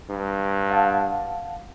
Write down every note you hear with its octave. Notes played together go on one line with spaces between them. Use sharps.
G2
F5 F#5 A5